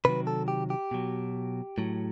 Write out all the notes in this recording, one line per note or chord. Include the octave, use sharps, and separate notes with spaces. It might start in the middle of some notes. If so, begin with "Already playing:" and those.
C3 D#3 F#3 B4
A4
G4
G4
B2 F#3
A2 F#3